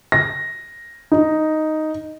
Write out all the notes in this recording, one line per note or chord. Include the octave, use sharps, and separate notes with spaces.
A#6
D#4